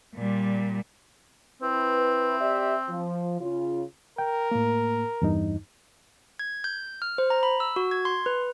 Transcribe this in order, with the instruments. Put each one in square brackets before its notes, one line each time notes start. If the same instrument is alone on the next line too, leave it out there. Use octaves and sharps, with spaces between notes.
[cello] A#2 G3
[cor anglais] C4 [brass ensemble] E4 B4
[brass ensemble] G4 D5 E5
F3
C#3 F4
[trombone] A#4 [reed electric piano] G5
[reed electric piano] A2 A#3
E2 G2 D#4
[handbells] G#6
G6
F6
C5
A#5
B5
E6
F#4
G#6
C6
B4